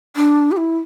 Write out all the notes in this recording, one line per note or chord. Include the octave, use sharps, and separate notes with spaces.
D4
G4
E4